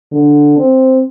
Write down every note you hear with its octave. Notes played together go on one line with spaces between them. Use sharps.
D3
C4